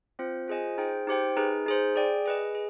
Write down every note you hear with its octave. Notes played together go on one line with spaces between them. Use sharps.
C4 F4 C5
F4 G#4 C5 D#5 G#5
D#4 G#4 C5 G5
D#4 G4 C5 G5
D#4 G#4 B4
D#4 G#4 C5
G#4 D5 G5
G#4 B4 D#5
G#4